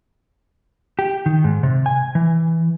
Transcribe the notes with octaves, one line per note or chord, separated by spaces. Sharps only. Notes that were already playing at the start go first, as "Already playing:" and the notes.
G4
D#3
G#2
C3
G#5
E3